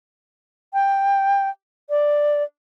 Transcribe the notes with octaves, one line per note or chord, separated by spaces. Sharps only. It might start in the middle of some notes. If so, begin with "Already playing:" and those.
G5
D5